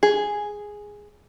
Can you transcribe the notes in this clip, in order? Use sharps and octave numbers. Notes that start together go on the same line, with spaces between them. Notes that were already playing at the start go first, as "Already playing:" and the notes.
G#4